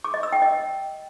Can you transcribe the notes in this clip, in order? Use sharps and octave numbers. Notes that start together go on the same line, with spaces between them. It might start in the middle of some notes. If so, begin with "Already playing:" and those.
D6
D#5
E6
G5
D#5